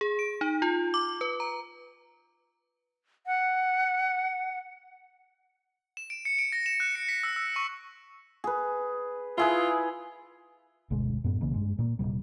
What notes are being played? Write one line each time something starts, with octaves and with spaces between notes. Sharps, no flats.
G#4
D7
D#4
F4
D6
B4
A#5
F#5
E7
D7
C#7
D7
A#6
E7
F#6
C#7
B6
E6
E6
C#6
G#4 B4
E4 F4 G#4 B4
F#1 D2 B2 G#3
F#2 A2 B3
B1 C#3 E3 A#3
G2 G#3
A#2 A#3
D#1 A#1 C3 G3